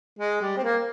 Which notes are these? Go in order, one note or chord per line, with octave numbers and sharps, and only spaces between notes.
G#3
G3
C4
A#3